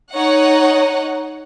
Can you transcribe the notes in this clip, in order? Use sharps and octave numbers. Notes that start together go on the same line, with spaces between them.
D#4 C#5 D#5 F#5